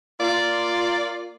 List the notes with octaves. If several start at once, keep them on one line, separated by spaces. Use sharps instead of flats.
A#3 F4 D5